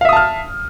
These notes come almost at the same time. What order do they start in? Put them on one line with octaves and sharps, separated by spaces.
F5 E5 D#6 A5 F6